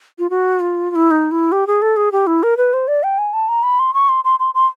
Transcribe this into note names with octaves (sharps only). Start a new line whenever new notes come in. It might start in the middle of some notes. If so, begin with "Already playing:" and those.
F4
F#4
F4
F4
E4
D#4
E4
G4
G#4
A4
G#4
G4
E4
A#4
B4
C5
D5
G5
G#5
A5
A#5
B5
C6
C#6
C6
C6
C6
C6